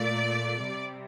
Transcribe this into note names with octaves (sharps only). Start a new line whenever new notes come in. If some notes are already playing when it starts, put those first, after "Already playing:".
Already playing: A#2 A3 D5
C3 G3